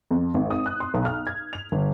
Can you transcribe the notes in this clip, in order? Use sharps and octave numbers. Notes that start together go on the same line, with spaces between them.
F2
G#1
D#6
F#6
C6
B1
F6
G#6
F7
G1